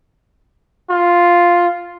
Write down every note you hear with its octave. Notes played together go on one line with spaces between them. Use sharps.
F4